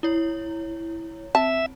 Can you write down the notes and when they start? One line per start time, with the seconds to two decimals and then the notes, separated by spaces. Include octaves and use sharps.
0.03 E4 C#5
1.35 C4 E5 A5